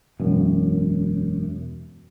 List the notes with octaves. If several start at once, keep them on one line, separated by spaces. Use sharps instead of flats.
E1 F#2